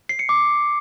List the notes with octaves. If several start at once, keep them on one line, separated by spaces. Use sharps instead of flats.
C7
C#7
D6